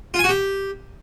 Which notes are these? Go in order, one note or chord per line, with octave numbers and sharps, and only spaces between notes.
F4
G#5
F#4
G4